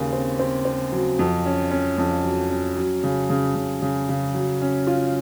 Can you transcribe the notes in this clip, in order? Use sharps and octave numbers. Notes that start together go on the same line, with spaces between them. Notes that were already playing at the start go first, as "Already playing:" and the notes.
Already playing: D#2 C#3
C4
C4
C4
F#3
F2
C#4
C#4
F2
F#3
C#4
F#3
C#3
C#3
C#3
C#3
C#3
F#3
C#4
F4